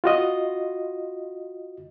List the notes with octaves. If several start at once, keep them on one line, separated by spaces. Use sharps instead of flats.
F4 F#4 D#5